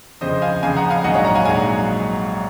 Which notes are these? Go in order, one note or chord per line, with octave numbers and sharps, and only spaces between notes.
F2 C#3 F3 C5 D#5
F5 G#5
F2 C#3 F3 F5 G#5
F#5 A#5
F5 G#5
A#1 G#2 F#3 D#5 F#5
C#5 F5
F#5 A#5
F5 G#5
A#1 G#2 F#3 F5 G#5